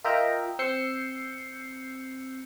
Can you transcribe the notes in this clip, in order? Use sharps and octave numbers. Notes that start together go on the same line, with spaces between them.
F4 A#4 D#5 E5 G5 A#5
C4 E6 G6 C7 C#7